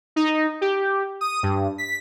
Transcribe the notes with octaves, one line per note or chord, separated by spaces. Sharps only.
D#4
G4
D#6
G2
B6